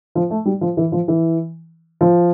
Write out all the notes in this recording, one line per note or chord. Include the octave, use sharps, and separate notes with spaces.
F3
A3
G3
F3
E3
F3
E3
F3